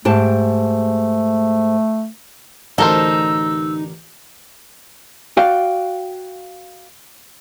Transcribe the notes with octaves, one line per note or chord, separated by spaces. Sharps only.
G#2 A3 G4 A5
A1 D2 D#4 A4 A#4 C5 E6
F#4 D5 F5 G5